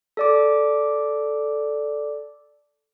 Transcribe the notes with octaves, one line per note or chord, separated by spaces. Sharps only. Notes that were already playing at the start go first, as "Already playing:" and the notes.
A4 D5 D6